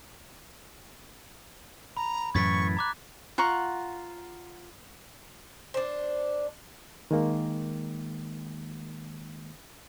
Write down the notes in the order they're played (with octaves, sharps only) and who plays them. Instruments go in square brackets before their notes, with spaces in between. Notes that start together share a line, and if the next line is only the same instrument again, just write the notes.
[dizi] A#5 [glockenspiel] B5
[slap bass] F#2 A2 E3 [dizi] C#6 [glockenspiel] G#6 A6 B6
[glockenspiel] A#5 D6 F#6 [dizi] B5
[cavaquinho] F4 F#5 A#5 C#6
[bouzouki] D4 C5
[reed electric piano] D#3 G#3 A#3